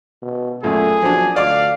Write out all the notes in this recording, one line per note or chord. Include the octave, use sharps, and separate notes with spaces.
B2
F#2 A#2 A3 G#4
A#1 F3 F#3 D4
D2 D5 F5 D6